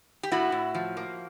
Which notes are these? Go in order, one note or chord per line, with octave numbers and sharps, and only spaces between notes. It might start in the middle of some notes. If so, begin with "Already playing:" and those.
G4
A2 E4 F#4
A2
F3
A#3